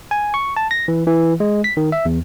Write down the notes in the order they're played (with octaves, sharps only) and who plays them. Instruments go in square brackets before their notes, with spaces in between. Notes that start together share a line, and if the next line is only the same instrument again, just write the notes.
[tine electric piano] G#5
C#6
A5
A#6
E3
E3
G#3
B6
D#3
E5
E2